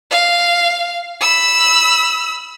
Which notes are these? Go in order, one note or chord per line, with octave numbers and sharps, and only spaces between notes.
F5
B5 E6